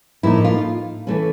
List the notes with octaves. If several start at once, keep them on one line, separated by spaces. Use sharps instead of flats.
A2 F3 A#3 D#4 E4
F4
E3 A3 C#4